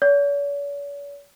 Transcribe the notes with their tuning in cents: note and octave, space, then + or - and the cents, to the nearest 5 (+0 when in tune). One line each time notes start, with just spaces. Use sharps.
C#5 +45